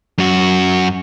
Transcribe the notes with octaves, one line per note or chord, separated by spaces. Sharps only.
F#2 F#4